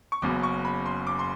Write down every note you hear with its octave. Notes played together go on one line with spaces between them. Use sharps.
C#6
F#1 F#2 C#3 F#3 B3 D6
C#6
B5
C6
D6
C6